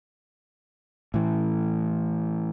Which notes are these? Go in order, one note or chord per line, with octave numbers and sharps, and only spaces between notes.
A2 E3